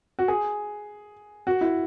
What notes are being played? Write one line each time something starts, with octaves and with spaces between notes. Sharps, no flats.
F#4
G#4
F#4
E4